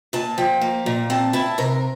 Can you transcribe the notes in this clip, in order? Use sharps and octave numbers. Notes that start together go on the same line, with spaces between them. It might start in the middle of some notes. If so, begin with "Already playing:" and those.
A#2 A5
F3 G5
A#3
A#2
C4 A5
E4 A5
C3 A#4